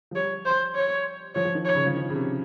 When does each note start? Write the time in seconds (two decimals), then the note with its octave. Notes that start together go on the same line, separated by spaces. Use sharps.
0.11 F3
0.15 G3 C#5
0.46 C5
0.75 C#5
1.35 F3 C#5
1.45 F3
1.55 D#3
1.65 C#5
1.75 C#3
1.86 F3
1.95 D#3
2.10 C#3
2.15 C3